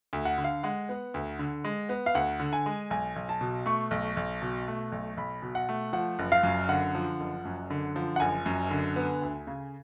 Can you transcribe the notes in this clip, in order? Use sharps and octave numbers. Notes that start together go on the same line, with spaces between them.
D2
F#5
D3
F5
G#3 F#5
B3
D2
D3
G#3
B3
F5
D2 F#5
D3
G#5
G#3
B1 G#5
B1
A5
B2
A3 C#6
B1
B1
B2
A3
B1
B1 B5
B2
F#5
A3
F3 F#5
F#1
F5
F#2
D3 F#5
F3
F#1
F#2
D3
F3
F#5
F#1 G#5
F#2
D3
B3
D2
C#3